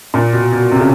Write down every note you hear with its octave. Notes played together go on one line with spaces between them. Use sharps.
A#2
B2
B2
C3
C#3